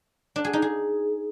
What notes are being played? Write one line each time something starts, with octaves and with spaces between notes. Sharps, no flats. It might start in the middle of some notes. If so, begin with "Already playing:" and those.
D4
G#4
D#4
G#4